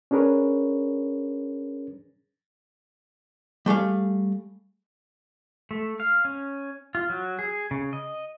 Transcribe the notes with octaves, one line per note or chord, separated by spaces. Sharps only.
C#4 D4 G#4 A#4 B4 C#5
G3 A3 G#4 F5
A3
F5
C#4
F4
F#3
G#4
C#3
D#5